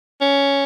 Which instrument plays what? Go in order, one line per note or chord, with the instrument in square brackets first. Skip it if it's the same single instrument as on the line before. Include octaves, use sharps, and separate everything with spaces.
[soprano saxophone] C#4